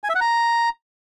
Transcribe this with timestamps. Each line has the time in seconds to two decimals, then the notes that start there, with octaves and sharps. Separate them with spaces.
0.04 G#5
0.09 E5
0.15 F#5
0.21 A#5